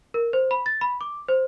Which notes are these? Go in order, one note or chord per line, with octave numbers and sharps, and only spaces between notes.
A#4
C5
B5
A6
B5
D6
C5